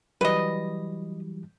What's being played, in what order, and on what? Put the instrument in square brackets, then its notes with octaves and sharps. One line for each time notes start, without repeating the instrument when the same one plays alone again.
[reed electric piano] E3 F#3 G3 [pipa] B4 D#5